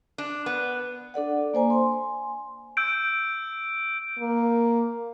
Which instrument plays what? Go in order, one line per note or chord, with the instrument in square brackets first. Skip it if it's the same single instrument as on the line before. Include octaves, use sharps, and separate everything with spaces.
[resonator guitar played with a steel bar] D4
B3
[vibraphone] D4 A4 D5 F#5
A#3 C5 G#5 A#5
G#5 C6
[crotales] E6 G6 D7
[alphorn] A#3